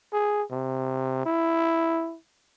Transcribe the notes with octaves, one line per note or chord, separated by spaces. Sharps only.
G#4
C3
E4